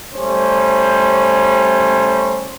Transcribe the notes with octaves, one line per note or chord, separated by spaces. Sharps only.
G3 A3 C#4 C5